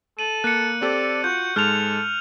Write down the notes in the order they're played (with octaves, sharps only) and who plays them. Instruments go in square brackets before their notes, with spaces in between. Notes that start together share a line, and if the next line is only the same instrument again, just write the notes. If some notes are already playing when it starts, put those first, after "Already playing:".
[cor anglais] A4 [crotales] D#7 F#7
[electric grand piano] A#3 [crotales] F#6 C#7
[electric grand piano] C4 G4 A4 [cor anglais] D5
[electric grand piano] F4 [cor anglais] F#4 [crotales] G6
[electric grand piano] G#2 G#3 [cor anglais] A4 [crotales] F6 F7